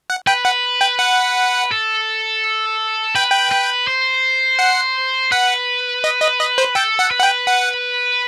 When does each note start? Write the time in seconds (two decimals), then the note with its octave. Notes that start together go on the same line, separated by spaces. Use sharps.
0.10 F#5
0.27 B4 G5
0.45 F#5
0.81 G5
0.99 F#5
1.71 A4
3.15 B4 G5
3.31 G5
3.51 B4
3.87 C5
4.59 F#5
5.31 B4 F#5
6.04 D#5
6.21 D#5
6.40 D#5
6.58 C5
6.75 A4 G5
6.99 F#5
7.11 B4
7.19 F#5
7.23 G5
7.47 F#5